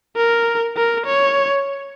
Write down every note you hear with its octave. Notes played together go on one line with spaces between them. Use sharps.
A#4
A#4
C#5